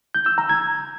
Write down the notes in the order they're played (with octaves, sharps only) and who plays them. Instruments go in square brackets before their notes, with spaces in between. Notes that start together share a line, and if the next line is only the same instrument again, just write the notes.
[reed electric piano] G6
E6
A#5
G#6